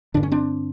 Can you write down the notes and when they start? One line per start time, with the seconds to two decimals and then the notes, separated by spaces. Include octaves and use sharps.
0.14 G2 D3 D4
0.23 C#4
0.32 C4 D4